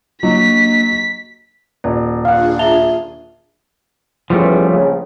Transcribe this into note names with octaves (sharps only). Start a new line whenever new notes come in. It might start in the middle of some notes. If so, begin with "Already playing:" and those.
F#3 A#3 D4 D#5 B6
D#1 D5
D4 F4 G#4 F5 F#5
E5 A5 A#5 F7 G7
E2 C#3 F3 G3 A3 B3
A#1 C#3